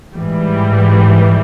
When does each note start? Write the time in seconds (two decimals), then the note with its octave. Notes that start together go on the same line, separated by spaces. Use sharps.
0.15 G#2 E3 G3